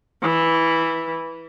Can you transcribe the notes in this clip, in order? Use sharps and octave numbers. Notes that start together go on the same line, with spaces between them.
E3